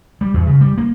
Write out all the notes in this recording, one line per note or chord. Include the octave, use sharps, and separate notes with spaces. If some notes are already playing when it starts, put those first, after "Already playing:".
G3
E2
C#3
G3
A#3